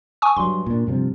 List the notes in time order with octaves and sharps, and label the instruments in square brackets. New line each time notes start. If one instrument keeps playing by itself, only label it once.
[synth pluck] G#5 C#6 D#6
[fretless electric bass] G2 F#3 [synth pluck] C6
[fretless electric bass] A#2 D4
G2 C3 F3